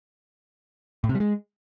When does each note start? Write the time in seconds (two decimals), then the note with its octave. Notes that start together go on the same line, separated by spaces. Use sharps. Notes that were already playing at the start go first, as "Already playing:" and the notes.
1.04 A2
1.09 C3
1.15 G3
1.20 G#3